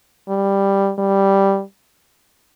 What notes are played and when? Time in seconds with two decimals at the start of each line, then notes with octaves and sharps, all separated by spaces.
0.29 G3
0.98 G3